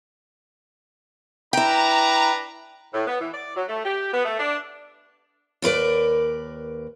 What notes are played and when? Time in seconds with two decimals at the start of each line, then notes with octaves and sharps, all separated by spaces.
1.53 D4 E4 B4 G5 A#5
2.94 A2
3.07 B3
3.21 E3
3.34 D5
3.57 F#3
3.69 A3
3.85 G4
4.14 B3
4.25 A3
4.39 D4
5.62 D#2 A#4 B4 D5